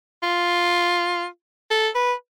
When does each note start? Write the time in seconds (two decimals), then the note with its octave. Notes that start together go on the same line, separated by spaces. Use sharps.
0.23 F4
1.71 A4
1.95 B4